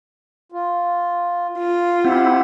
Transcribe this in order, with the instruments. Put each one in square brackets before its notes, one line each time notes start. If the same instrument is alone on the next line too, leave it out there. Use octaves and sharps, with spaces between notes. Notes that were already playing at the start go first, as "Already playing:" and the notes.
[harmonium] F4
[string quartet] F4
[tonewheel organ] C4 E4 [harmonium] G4 F#5